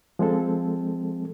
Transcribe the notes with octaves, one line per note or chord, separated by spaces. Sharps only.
F3 G#3 C4 A4